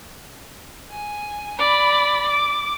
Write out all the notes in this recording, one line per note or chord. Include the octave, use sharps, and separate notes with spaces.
G#5
D5 B5
D6